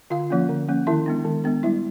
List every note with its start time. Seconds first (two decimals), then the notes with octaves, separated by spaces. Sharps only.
0.10 D3 F4 F5
0.30 F3 A#3 C#4
0.49 D3
0.69 F3 A#3 C#4
0.87 D#3 E4 E5
1.06 G#3 B3 D4
1.25 D#3
1.44 G#3 B3 D4
1.63 G3 E4 E5